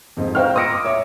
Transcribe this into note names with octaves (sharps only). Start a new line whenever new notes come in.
F2 G#2
C5 D#5 F5 G5 C#6 F6
D#6 E6 A#6 C#7 D7
D6
C#5 E5 D6